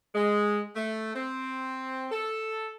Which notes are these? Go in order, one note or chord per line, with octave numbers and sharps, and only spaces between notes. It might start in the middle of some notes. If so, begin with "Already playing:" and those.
G#3
A3
C4
A4